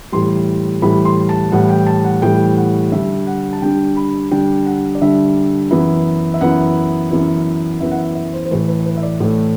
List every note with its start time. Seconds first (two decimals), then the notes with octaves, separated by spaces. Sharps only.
0.12 A2 E3 G3 C6
0.82 A2 E3 G3 B5
1.05 C6
1.29 A5
1.52 A2 E3 G3 F#5
1.70 G5
1.87 A5
2.04 F#5
2.22 A2 E3 G3 G5
2.57 F#5
2.92 D3 G3 D4 E5
3.27 F#5
3.53 A5
3.62 D3 G3 D4 G5
3.97 B5
4.31 D3 G3 D4 G5
4.66 F#5
4.95 D5
5.01 D3 G3 D4 E5
5.71 F#2 E3 B3 E4
6.34 E5
6.41 F#2 E3 B3 E4 F#5
7.11 F#2 E3 B3 E4
7.80 F#2 E3 B3 E4 E5
7.91 F#5
7.98 E5
8.15 E5
8.33 C5
8.46 C5
8.51 A2 E3 A3 B4
8.68 B4
8.86 B4
8.97 E5
9.03 D5
9.20 A2 E3 A3 D5